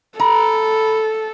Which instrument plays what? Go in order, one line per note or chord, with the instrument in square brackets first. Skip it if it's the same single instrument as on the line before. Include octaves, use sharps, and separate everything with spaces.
[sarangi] A4 [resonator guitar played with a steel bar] A#5 [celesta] B5